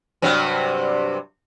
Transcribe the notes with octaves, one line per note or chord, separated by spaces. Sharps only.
G2 C3 F#3